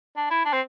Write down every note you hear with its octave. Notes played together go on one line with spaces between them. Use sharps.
D4
E4
D4
C4